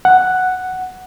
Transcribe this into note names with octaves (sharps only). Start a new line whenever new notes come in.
F#5